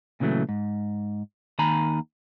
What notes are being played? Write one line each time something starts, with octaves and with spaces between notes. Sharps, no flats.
A#2 C#3 E3 F#3 A3
G#2
D#2 D#3 G#5 A#5 B5